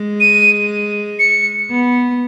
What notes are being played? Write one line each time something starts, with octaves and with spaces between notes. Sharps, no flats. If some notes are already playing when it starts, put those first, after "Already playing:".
Already playing: G#3
D#7
C#7
B3